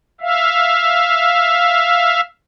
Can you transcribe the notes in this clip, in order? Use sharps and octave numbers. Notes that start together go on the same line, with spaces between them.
E5 F5